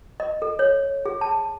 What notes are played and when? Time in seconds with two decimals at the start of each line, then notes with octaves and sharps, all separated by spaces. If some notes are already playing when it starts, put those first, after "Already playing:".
0.20 D#5
0.42 A4
0.59 C#5
1.06 G#4
1.21 A5